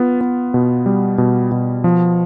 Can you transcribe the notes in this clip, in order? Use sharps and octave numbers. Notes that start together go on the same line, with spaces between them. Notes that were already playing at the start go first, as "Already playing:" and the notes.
Already playing: B3 F4
B3
B2
G3
B2
B2
F3